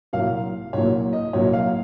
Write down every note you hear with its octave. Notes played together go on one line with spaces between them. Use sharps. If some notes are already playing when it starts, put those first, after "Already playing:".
C2 A#2 F#3 A#3 F5
C2 A#2 F#3 A#3 C#5
D#5
C2 A#2 F#3 A#3 C#5
F5